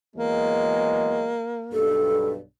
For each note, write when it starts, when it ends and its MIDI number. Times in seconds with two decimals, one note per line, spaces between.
0.16 1.35 40
0.16 1.35 54
0.16 1.35 56
0.16 1.96 58
1.73 2.39 35
1.73 2.39 43
1.73 2.26 69